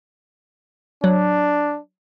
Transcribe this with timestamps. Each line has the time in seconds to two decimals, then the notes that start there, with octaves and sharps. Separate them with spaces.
1.04 F#3 D4